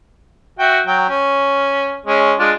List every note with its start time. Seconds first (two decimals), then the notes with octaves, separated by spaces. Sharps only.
0.59 F#4 E5 G5
0.87 F#3 G5
1.09 C#4
2.06 G#3 C#4
2.39 G#3 D4 F4